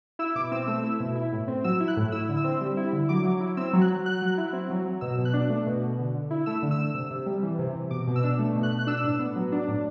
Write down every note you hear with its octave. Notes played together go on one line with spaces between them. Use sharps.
E4 E6
B2 D6
C4 E6
A3 E6
E4
B2
E4
A2
C4
F#3 E6
E4
F#6
A2
E4 E6
D3
E6
C4
G3
E4
D3
F#3 D6
F#3
E4
C4 E6
F#3
F#6
F#3
F#3 F#6
F#3
E4
C4
F#3
F#3
B2 E6
B2
F#6
D4
A3
B2
B2
D3
D3
E4
A3 E6
D3
E6
D3
C3
C3
G3
E3
C3
C3
B2 D6
B2
E6
D4
A3
B2
F#6
B2
F#6
D4 E6
A2
B3
F#3
D4
A2